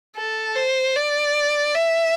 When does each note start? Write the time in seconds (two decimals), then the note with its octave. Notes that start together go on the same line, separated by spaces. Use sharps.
0.16 A4
0.56 C5
0.96 D5
1.75 E5